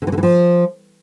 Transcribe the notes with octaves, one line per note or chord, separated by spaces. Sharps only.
D3
E3
D3
E3
F3